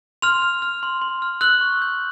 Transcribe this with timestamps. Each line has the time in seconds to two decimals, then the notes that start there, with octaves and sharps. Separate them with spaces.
0.22 C6 F6 F7
0.42 F6
0.62 F6
0.83 C6
1.02 C6
1.22 F6
1.41 E6 F#6 F#7
1.61 C#6
1.82 G6